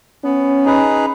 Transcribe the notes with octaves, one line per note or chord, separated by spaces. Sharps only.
B3 C#4
D#4 G#4 B4